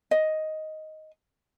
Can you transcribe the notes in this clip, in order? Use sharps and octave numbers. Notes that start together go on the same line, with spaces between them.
D#5